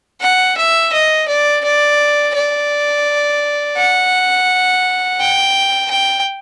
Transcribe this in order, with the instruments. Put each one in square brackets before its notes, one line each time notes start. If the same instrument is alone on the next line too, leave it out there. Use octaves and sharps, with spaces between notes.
[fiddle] F#5
E5
D#5
D5
D5
D5
F#5
G5
G5